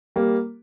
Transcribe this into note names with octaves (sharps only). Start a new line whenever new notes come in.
G3 A#3